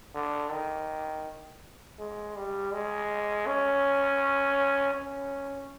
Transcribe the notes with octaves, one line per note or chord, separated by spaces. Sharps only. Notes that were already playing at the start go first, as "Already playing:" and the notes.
D3
D#3
G#3
G3
G#3
C#4
C#4